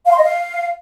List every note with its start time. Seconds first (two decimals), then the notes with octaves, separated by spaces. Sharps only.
0.05 F5
0.11 C6
0.17 D#5
0.23 F5